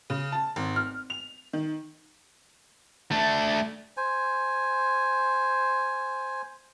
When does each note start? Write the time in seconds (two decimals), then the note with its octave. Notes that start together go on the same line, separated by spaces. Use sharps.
0.10 C#3
0.32 A5
0.56 G#1
0.76 F6
1.10 F7
1.53 D#3
3.11 A3 D4
3.97 C5 G#5